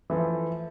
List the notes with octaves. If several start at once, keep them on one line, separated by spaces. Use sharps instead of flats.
E3 F3 A3